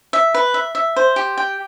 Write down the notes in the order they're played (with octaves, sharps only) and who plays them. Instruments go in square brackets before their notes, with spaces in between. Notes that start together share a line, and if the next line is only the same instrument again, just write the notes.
[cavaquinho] E5
B4
E5
E5
C5
G4
G5